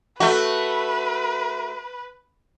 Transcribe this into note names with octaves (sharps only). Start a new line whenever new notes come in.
A3 F#4 B4